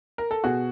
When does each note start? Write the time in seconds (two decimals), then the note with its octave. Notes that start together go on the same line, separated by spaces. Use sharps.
0.18 A#4
0.31 A4
0.44 B2 F#4 G#4